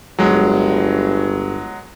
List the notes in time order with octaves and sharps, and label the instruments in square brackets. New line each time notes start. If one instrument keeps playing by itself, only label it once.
[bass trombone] G1 [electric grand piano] F#3 G#3